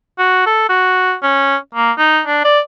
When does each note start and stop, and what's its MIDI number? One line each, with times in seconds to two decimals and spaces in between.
0.18 0.43 66
0.46 0.64 69
0.69 1.14 66
1.23 1.56 61
1.75 1.92 58
1.98 2.21 63
2.27 2.42 62
2.45 2.60 74